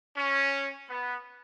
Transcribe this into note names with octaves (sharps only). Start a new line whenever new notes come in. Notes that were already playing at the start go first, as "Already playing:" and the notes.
C#4
B3